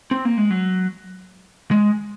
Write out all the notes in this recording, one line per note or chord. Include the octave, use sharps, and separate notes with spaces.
C4
A#3
G#3
F#3
G#3